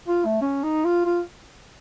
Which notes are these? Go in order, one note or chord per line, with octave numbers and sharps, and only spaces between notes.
F4
A3
C#4
D#4
F4
F4